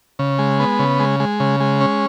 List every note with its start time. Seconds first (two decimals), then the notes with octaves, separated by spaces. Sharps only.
0.19 C#3
0.39 G#3
0.59 B3
0.79 C#3
1.00 G#3
1.20 G#3
1.40 C#3
1.60 G#3
1.81 C#4